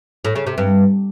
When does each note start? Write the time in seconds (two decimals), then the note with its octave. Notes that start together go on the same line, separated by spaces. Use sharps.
0.25 A2
0.36 C#3
0.47 C3
0.58 G2